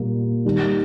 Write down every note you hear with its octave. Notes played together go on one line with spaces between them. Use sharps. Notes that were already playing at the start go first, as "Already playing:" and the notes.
Already playing: A#2 G3 A#3
D#3 G3 A#3